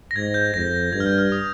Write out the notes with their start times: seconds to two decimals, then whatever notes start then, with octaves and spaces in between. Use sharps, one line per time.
0.11 A#6
0.16 G#2 G#6
0.34 G6
0.54 F2 A#6
0.93 G2 G#6
1.00 F6
1.06 G6
1.18 F6
1.32 D#6